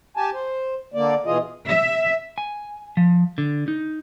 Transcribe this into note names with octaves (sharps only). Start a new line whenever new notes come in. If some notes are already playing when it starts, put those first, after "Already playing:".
G4 G#5 A5
C5
D3 A#3 D5
B2 E3 F4 G#4 D#5
E5
G#5
F3
D3
D#4